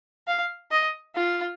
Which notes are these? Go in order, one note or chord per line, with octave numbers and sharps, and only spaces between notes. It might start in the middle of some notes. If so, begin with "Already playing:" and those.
F5
D#5
F4